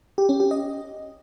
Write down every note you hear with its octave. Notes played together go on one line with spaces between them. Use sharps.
G4
C#4
G4
D#5